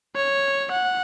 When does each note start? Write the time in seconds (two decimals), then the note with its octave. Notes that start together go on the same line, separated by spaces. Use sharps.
0.16 C#5
0.71 F#5